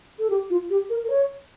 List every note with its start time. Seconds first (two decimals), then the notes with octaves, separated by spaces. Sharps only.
0.19 A4
0.30 G4
0.50 F4
0.70 G4
0.90 A#4
1.04 A#4
1.10 C#5